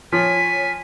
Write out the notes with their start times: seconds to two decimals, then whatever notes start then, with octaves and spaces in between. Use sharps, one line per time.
0.13 F3 C#5 G#5 B6